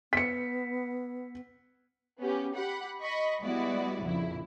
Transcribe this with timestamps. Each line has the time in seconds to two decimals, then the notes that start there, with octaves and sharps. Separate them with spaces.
0.13 B3 B6 C#7
2.19 B3 C#4 G4
2.55 G4 F#5 B5
3.02 D#5 B5 C#6
3.43 G3 G#3 B3 E4 F#4 D5
4.03 A#1 F2 C#3 E4